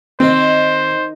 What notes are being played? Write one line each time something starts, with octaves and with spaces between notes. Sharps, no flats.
D#3 C4 C5